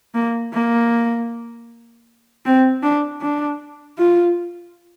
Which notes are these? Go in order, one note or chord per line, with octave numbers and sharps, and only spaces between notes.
A#3
A#3
C4
D4
D4
F4